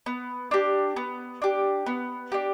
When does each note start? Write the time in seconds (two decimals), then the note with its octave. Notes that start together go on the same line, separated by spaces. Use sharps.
0.06 B3
0.51 D4 G4
0.96 B3
1.42 D4 G4
1.86 B3
2.32 D4 G4